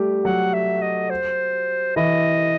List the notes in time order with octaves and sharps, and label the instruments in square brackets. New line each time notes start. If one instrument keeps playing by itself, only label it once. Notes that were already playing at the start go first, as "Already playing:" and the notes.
Already playing: [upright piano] G3 A3 G4
[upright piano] F#3 F#4 [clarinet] F#5
[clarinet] E5
D#5
C5
[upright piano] E3 E4 [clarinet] D#5